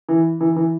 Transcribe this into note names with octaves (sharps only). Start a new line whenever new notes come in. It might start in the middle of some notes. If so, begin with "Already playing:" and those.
E3
E3
E3